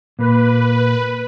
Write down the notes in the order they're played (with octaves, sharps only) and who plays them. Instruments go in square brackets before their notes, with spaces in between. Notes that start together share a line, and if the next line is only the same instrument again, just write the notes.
[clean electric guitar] A#2 A#3 [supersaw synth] B4